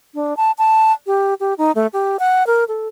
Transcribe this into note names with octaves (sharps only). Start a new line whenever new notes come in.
D4
A5
A5
G4
G4
D#4
A3
G4
F#5
A#4
A4